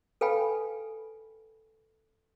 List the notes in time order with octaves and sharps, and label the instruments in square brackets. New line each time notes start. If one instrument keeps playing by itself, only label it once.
[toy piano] A4 B4 F5 G5 G#5 B5